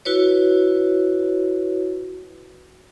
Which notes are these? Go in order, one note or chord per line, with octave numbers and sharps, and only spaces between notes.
E4 F#4 B4 C#5